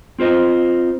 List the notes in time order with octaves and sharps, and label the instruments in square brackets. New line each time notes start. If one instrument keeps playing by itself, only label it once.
[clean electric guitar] C4 F4 C5 D#5